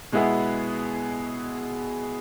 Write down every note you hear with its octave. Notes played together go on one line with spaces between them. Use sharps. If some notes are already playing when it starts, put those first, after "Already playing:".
B2 G#3 B3 E4 G#4